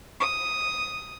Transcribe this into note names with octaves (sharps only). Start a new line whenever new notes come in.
D#6